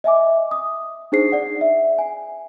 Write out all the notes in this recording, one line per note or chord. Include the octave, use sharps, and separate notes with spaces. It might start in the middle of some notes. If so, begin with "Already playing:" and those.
D#5 E5 G#5 D6
D#6
D4 D#4 G#4 C5 C7
D5 F#5
E5
G#5